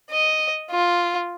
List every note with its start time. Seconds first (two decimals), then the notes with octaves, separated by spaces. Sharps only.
0.11 D#5
0.71 F4